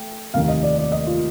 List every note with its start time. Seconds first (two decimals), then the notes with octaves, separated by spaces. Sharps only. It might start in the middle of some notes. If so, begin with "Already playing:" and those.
Already playing: A3 G5
0.34 F1 D#2 D#3 F5
0.48 D#5
0.63 D5
0.78 D5
0.92 D#5
1.07 F4